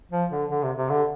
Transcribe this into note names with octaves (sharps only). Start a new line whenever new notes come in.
F3
D3
D3
C3
C3
D3